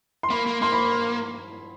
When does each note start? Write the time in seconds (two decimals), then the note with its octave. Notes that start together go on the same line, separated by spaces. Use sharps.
0.23 C6
0.30 A#3 B5
0.46 A#3
0.61 A#3 C6
0.72 B5